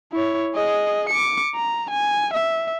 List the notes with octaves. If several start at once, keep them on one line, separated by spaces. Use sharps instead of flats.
E4 C#5
G#4 D#5
D6 C#7
A#5
G#5
E5